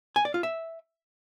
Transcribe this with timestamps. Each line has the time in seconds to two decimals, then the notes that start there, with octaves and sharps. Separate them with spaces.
0.16 G#5
0.25 D5
0.34 F4
0.43 E5